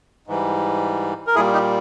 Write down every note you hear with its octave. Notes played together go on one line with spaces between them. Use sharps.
G#2 E3 G3
A#4
A#2 G3 E4 G#4
D#4 G4